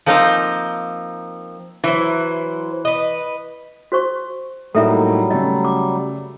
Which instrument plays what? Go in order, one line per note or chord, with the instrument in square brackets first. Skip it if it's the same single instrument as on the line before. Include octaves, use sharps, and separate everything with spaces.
[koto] F3 A#3 C4 D#4 C5 F5
[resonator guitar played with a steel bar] E3 [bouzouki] F#3 C5
[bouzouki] B4 D#5
[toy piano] F#4 C5 C#6
[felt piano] A2 A#3 D#4 [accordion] F#3 G3 [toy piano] A4 E5 A#5
[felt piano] C#3 A3 [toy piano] D#5
[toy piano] D6